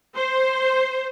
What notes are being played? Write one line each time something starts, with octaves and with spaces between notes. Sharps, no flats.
C5